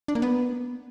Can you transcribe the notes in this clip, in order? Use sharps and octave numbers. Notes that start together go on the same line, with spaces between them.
D4
A#3
B3